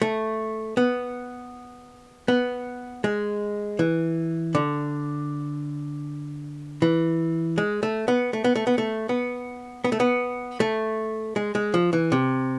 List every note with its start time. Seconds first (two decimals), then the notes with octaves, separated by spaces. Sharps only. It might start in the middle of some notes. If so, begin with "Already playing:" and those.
0.02 A3
0.77 B3
2.28 B3
3.04 G#3
3.79 E3
4.55 D3
6.82 E3
7.58 G#3
7.83 A3
8.08 B3
8.33 A3
8.44 B3
8.56 A3
8.67 B3
8.78 A3
9.09 B3
9.84 B3
9.92 A3
10.00 B3
10.60 A3
11.36 G#3
11.55 G#3
11.74 F3
11.93 E3
12.12 C3